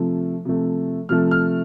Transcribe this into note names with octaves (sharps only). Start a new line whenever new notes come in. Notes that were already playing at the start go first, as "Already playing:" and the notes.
Already playing: C3 F3 A3
C3 F3 A3
C3 F3 A3 F6
F6